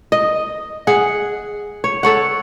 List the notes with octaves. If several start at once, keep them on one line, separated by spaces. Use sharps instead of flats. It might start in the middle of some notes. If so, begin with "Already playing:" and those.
D#5
G#4 F#5
C#5
A4 C#5 F#5